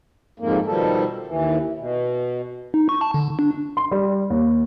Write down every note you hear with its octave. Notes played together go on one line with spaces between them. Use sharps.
F2 G#2 A#3
B2 D#3 F3 G3 A4
D#2 E3
B2
D#4
C#6
A5
D3
D4
C6
G3
D#2